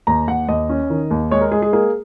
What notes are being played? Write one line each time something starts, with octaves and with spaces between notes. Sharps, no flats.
D#2 A#5
D#2 F#5
D#2 D#5
C#4
D#3
D#2
G#3 C#5
A#4
G#3 G#4
G#4
A#3 G#4